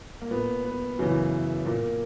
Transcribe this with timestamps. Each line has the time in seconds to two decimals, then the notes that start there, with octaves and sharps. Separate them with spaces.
0.22 A#3
0.31 A#2 B3
0.65 B3
0.99 F#2 C#3 E3
1.66 A#2 A#3